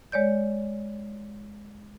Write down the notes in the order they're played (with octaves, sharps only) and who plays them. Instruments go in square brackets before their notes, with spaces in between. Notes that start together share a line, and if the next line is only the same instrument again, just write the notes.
[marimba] G#3 C#5 D5 G6